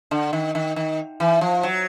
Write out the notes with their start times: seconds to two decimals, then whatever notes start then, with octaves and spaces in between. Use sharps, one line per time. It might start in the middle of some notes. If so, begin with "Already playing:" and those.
0.11 D3
0.33 D#3
0.55 D#3
0.76 D#3
1.20 E3
1.41 F3
1.63 F#3